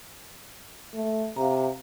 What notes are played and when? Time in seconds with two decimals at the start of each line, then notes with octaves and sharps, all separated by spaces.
0.94 A3
1.37 C3 F5 A#5